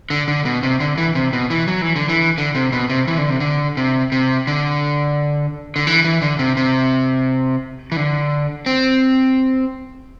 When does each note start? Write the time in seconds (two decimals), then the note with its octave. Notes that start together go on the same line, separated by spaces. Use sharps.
0.10 D3
0.28 D3
0.45 B2
0.63 C3
0.80 D3
0.98 E3
1.15 C3
1.33 B2
1.50 E3
1.68 F#3
1.82 E3
1.96 D3
2.09 E3
2.38 D3
2.55 C3
2.72 B2
2.89 C3
3.08 E3
3.18 D3
3.30 C3
3.40 D3
3.77 C3
4.12 C3
4.47 D3
5.76 D3
5.87 E3
6.04 E3
6.22 D3
6.39 C3
6.57 C3
7.92 E3
7.97 D3
8.66 C4